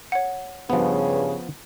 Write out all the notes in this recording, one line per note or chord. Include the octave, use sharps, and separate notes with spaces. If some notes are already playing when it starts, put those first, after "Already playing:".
C#5 F#5
G2 C#3 F3 B3